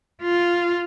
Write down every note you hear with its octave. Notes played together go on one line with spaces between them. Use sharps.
F4